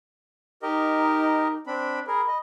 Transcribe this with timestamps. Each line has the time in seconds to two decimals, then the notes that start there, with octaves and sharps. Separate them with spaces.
0.62 D#4 G4 A#4 D#5
1.67 C4 D4 B5
2.07 G#4 A#4 B5
2.28 D#5